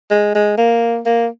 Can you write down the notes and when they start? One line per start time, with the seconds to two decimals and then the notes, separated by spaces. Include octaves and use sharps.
0.10 G#3
0.35 G#3
0.58 A#3
1.06 A#3